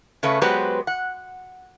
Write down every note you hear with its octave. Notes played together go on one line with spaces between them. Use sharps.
C#3 A3 C#4 B4
F#3 G#3 B3 G4 B4 C5
F#5